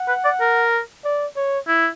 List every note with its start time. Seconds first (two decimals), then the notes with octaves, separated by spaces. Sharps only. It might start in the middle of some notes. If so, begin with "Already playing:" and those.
Already playing: F#5
0.08 B4
0.25 D5
0.41 A#4
1.04 D5
1.36 C#5
1.68 E4